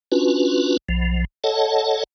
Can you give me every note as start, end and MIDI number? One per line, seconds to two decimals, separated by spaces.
0.12 0.77 61
0.12 0.77 62
0.12 0.77 65
0.12 0.77 66
0.12 0.77 71
0.89 1.25 35
0.89 1.25 53
1.44 2.04 69
1.44 2.04 73
1.44 2.04 75
1.44 2.04 78
1.44 2.04 81